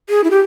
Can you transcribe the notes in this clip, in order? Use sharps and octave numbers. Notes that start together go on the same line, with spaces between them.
G#4
E4
G4